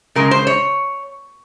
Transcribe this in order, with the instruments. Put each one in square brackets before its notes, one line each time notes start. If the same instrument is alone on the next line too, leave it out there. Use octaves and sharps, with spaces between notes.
[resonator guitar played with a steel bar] C#3 G#3 A#4
C5
C#5